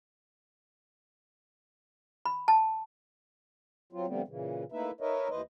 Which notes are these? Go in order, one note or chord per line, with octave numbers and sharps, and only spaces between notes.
B5
A5
F#3 C4 F4
D3 F3 G3 A3 B3 C4
A#2 C#3 E3
A3 A#3 D#4 E4 B4 E5
D#4 A#4 B4 C#5 D#5 E5
D#2 E3 B4 C5 D#5